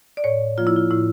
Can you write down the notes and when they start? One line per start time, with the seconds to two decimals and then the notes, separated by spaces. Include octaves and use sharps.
0.17 D5
0.24 A2 C#5
0.57 F3 A#3 F4
0.67 E4
0.76 F4
0.91 A2 E4